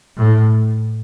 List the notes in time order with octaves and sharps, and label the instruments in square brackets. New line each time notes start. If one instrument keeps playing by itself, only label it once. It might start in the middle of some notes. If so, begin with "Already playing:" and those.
[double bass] A2